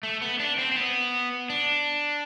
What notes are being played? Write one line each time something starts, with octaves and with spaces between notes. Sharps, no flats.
A3
B3
D4
C4
C4
B3
D4